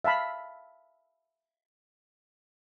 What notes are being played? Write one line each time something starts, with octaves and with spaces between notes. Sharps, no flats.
E5 F5 A5 B5